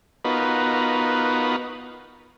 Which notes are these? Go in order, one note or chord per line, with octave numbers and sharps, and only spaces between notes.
B3 D#4 F4 F#4 A#4 B4